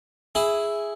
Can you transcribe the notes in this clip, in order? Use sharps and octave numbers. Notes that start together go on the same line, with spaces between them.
E4 G#4